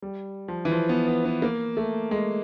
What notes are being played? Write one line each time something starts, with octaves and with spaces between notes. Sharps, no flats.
G3
F3
E3
F3
B3
B3
B3
A#3
A3
G#3